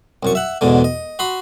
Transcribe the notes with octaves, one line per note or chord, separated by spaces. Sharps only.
C2 F#2 C#6
E5 F#5
E2 G#2 B2 D3
D#5
F#4 B5 C6 D#6